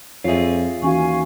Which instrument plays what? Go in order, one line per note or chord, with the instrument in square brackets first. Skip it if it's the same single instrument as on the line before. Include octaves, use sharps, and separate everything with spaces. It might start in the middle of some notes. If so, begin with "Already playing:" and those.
[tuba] F2 [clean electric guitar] F4 G#4 [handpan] C#5 E5
[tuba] D#2 [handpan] E3 C#4 F#4 [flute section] F5 G#5 C#6